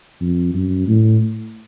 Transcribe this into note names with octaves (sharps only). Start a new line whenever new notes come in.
F2
F#2
A2